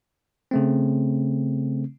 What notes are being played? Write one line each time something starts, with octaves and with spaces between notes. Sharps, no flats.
C#3 A3 C4